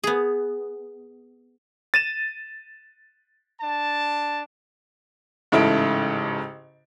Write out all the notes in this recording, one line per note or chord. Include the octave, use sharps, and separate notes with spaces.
B3 G#4
A6 D#7 E7
D4 A5
A1 G#2 C#3 E4 A4 D7